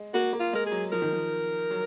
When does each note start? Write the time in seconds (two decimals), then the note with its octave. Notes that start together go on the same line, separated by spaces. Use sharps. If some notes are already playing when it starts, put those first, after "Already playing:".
Already playing: G#3
0.14 A#3 F#4
0.33 A#3
0.40 F4
0.53 G#3 A#4
0.66 G#4
0.72 F#3
0.92 F3 A#4
1.02 D#3
1.13 F3
1.71 F#3